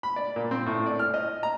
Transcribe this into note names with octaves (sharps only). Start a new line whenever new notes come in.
B5
D5
A#2
C4
A2
D5
F6
D#5
A#5